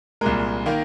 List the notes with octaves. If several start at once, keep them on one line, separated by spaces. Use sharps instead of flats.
C2 A#2 G#3 A#4
D#3 A#3